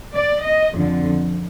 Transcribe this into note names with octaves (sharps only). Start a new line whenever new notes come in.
D5
D#5
F2 D3 F3